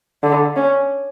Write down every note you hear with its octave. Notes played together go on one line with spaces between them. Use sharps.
D3
C#4